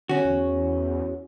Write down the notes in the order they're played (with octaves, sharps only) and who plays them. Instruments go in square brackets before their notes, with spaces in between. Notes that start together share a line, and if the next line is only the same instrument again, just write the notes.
[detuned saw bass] D3 [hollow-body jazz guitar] C#4 F#4
[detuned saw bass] E2